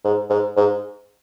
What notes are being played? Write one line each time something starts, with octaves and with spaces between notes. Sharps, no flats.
G#2
G#2
G#2